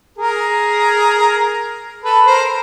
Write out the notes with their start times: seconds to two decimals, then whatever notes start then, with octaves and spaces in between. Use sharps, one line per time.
0.18 G#4 A#4
2.03 A4 B4
2.27 A#4 C5